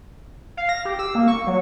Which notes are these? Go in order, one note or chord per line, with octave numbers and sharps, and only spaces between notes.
F5
A#6
G4
E6
A#3
C#6
F#3